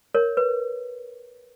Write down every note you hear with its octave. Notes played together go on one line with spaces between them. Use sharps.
A#4 C#5
B4